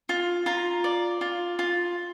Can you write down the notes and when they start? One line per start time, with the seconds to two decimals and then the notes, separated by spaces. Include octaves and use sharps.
0.09 F4
0.46 F4 A#5
0.84 D5
1.21 F4
1.59 F4